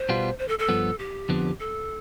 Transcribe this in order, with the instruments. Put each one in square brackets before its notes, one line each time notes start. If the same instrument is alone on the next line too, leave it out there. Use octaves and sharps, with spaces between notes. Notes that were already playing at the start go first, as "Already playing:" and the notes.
Already playing: [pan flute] C5
[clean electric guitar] B2 G3 B3 F4
[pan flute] C5
A4
A4
[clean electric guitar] G2 F3 B3
[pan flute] G4
[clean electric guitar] F2 D3 F3 B3
[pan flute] A4